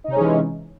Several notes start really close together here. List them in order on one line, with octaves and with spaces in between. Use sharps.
D#4 C3 C#4 G#3 E3